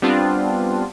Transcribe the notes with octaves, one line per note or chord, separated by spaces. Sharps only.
G3 B3 C4 D4 F4